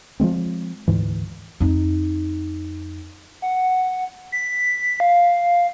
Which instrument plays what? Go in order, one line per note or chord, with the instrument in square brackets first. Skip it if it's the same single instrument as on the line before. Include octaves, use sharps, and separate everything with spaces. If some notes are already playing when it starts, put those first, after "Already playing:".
[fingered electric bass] F3 F#3 G#3 C4
D2 G#2 E3
[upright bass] F2 D#4
[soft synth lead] F#5
B6
F5